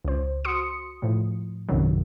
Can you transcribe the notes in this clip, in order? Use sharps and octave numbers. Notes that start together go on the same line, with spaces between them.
C#2 C5
F#4 C6 D#6 C#7
A2 F3
A#1 F#2 C3 D#3 F#3